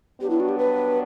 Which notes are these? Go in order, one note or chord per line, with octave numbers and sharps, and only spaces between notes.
G2 F#3 B3 D4 G4
E4
F#4
G4
B4